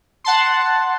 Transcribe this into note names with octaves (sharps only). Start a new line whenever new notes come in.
F#5 A5 C6